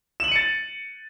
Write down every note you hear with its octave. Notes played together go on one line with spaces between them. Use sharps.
A6 C#7 D#7 E7 F#7